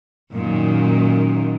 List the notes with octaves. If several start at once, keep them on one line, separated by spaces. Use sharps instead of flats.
F#2 A#2 D#3